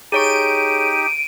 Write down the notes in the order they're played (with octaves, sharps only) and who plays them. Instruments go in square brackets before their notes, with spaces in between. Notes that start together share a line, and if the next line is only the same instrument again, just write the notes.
[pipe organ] D#4 G4 [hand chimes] G#4 C#5 C#6 [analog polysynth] D7 D#7